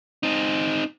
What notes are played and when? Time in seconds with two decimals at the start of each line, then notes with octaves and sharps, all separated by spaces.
0.23 C4 D#4